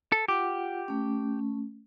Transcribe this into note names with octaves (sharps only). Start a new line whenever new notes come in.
A4
F4 G4 F#5
A3 C#4